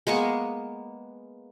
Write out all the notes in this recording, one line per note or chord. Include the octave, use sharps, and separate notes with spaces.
G#3 A#3 B3 C#6